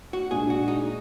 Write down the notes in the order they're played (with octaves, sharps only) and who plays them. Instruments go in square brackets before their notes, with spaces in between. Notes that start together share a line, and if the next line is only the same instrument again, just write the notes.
[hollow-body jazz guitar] F#4
[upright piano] A#2 G#3 D4 [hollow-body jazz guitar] G#4
[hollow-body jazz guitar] F#4
D#4